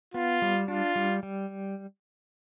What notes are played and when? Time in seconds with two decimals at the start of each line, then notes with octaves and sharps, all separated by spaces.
0.14 B3 F4
0.42 G3
0.68 D4 F4
0.96 G3
1.23 G3